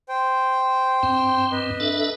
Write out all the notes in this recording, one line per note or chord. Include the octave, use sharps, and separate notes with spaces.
C5 G5
G2 C4
B4 D#5
D4 A4 E5